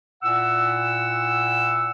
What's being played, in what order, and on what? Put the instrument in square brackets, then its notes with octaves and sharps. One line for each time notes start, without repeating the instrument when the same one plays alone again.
[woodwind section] A#2 E4 F#5 E6